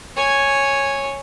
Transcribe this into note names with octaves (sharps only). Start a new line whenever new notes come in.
C#5 G#5